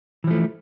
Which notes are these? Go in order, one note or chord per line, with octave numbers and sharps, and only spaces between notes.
E3 F3 A3